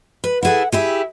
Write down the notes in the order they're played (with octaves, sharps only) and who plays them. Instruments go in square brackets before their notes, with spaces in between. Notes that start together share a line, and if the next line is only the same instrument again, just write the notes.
[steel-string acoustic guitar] B4
[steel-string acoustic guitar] E4 G#4 A4 [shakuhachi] F#5
[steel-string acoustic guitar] E4 G4 G#4 [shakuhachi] E5